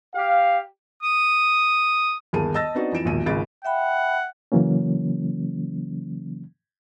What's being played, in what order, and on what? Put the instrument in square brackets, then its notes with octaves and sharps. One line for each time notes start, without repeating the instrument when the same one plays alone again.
[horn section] G4 F5
[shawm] D#6
[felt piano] G1 D#2 G#4 A#4 A5 D#7
D#5 A5 E6 A6 A#6
B3 C4 D4 D#4 F#4
F2 E3 D7 E7
E1 A#1 D#2 D#7
G#1 C#2 G#4 A6 D7
[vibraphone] E5 G5 B5 [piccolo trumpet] F#5
[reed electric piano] C#3 E3 F#3 A#3 C#4